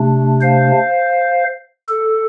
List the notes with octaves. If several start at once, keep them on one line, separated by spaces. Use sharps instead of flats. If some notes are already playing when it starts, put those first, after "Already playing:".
Already playing: C3 A3 D4
C5 F5
A4